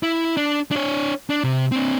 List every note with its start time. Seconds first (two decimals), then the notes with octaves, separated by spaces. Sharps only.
0.03 E4
0.37 D4
0.71 D4 C#5
1.30 D4
1.44 C3
1.72 C4 D4